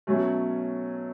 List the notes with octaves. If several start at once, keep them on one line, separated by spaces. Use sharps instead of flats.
B2 F#3 A3 C#4